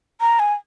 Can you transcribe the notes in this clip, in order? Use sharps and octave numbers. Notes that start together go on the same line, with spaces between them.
A#5
G#5